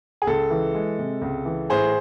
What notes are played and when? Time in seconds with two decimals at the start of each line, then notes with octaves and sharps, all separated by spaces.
0.22 G#4
0.27 C#2 A4
0.50 E3
0.75 G#3
0.98 C3
1.22 C#2
1.45 E3
1.70 A2 G#4 C5